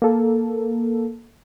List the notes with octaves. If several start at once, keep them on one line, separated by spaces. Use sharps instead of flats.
A#3 A4